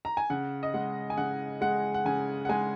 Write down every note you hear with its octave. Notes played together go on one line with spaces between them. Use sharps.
A#5
G#5
C#3 F#5
D#5
G#3 F#5
G#5
C#3 F#5
G#3 F#5
F#5
C#3 G#5
F#5
G#3 G#5